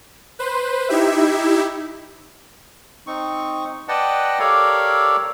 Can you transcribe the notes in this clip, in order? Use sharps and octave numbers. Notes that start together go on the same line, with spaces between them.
B4 C5
D#4 E4 G4 E5
C4 D#4 C#6
B4 D5 D#5 F#5 G5 A5
G4 A4 A#4 C#5 D5 F5